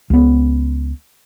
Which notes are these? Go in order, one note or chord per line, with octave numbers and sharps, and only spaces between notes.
C#2 B3